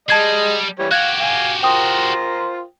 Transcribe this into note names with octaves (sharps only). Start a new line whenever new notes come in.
G3 G#3 D#5 A5 G#6 C7
E3 G3 C#5
F#4 G4 F5 F#6 G#6
F5 G#5
F4 A#4 C5 G5 D#6